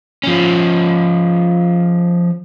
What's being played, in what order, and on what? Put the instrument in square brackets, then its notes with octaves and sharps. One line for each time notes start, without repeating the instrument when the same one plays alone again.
[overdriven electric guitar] F3 C#4